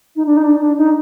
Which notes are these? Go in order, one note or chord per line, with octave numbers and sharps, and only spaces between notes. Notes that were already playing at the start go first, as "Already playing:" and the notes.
D#4
D4
D#4
D4
D4
D#4